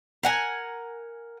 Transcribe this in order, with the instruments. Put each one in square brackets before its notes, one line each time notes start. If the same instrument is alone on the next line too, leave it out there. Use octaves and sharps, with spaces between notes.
[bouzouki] A#4 F#5 G#5